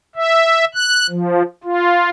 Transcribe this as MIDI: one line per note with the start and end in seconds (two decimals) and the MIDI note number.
0.16 0.65 76
0.75 1.07 90
1.09 1.42 53
1.64 2.10 65